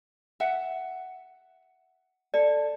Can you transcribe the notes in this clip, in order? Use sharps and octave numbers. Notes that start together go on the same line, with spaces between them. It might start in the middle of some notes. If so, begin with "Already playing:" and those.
E5 F#5
A4 D5